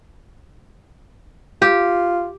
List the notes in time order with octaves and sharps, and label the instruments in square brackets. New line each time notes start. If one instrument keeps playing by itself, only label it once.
[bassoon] F4 [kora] G4